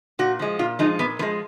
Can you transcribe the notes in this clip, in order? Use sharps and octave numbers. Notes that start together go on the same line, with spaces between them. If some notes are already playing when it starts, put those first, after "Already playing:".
A#2 F#4
F3 G#3
A#2 F4
F3 G#3 D#4
A#2 B3
F3 G#3 B3